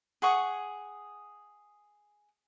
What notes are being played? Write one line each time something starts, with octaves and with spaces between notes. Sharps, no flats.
G#4 F#5 C#6 D#6